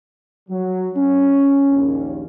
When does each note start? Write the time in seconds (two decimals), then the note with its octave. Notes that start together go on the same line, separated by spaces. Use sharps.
0.49 F#3
0.95 C#4
1.70 A#1 D#2